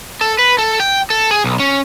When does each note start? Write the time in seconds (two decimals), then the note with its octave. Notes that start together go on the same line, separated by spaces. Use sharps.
0.21 A4
0.39 B4
0.59 A4
0.80 G5
1.10 A4
1.31 G#4
1.44 B1
1.60 C#4